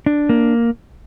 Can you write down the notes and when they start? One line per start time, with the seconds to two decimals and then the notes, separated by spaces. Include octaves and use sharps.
0.06 D4
0.29 A#3